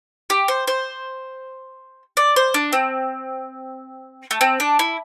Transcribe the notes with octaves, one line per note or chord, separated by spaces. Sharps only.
G4
C5
C5
D5
C5
D4
C4
A3
C4
D4
E4